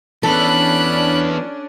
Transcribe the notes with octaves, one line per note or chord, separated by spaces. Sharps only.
E3 B3 C#4 D4 A4 B5 F#6